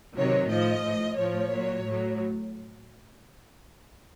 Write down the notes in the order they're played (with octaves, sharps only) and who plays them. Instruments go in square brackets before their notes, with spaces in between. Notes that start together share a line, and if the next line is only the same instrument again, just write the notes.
[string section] C3 D#3 F#3 C#5
A2 F3 D#5
A2 F3
A2 F3 C#5
A#2 F#3
A2 F#3